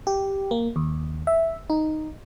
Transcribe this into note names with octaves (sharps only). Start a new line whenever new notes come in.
G4
A#3
D#2
E5
D#4